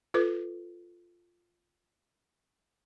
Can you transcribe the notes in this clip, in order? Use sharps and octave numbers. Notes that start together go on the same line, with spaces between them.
F4 A4 B4 D6